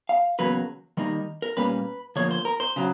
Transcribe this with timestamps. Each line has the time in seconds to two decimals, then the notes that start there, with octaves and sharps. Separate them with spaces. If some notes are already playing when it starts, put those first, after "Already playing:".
0.09 F5
0.39 E2 C#3 F#3 A#3 B4
0.97 D#3 G3 A#3 D#4
1.42 A#4
1.57 A#2 G3 A#3 C#4 B4
2.16 D3 F3 A#3 C#5
2.31 C5
2.45 A#4
2.60 C5
2.76 C#3 F#3